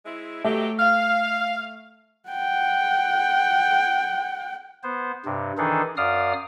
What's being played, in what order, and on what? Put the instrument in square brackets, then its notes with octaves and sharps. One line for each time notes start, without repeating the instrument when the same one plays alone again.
[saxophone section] G#3 C4 E4
[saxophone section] B2 F#3 G4 [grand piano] A3
[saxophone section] F5
[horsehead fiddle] F#5 G5
[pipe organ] B3 C5
G2 C3
D#3 E3 D4 D#4 G#4 A4
F#2 D5 F5 D#6 F6